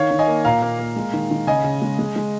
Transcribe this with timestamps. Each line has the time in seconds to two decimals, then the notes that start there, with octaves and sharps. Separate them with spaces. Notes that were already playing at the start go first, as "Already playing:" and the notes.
Already playing: D#3 C#5 F5
0.11 D#3
0.19 D#5 G#5
0.28 A#3
0.45 A#2 F5 A#5
0.62 A#3
0.79 A#3
0.96 G#3
1.13 D#3
1.31 D#3
1.47 C#3 D#5 G#5
1.64 C#3
1.82 G#3
1.99 G#3
2.16 G#3